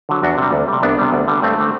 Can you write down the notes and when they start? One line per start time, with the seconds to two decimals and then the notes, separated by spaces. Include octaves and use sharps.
0.09 D3 F#3
0.23 E2 D4 F#4
0.38 C3 G3
0.53 D2
0.68 C3 G3
0.83 C2 B3 D4
0.99 C3 G3
1.12 D2
1.28 D3 G3
1.42 G2 A3 C4
1.58 D3 A3